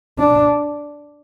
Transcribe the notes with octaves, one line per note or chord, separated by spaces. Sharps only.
D4